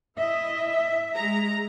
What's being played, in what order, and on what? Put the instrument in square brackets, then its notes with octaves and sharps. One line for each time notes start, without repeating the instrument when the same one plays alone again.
[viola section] E4 D#5 [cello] E5
[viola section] G#3 A#5